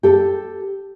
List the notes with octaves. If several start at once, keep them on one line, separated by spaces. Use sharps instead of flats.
G4 A4